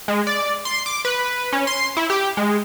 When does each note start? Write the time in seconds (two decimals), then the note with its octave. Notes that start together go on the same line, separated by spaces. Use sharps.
0.08 G#3
0.27 D5
0.65 C6
0.86 D6
1.05 B4
1.52 C#4
1.67 C6
1.97 E4
2.10 G4
2.37 G#3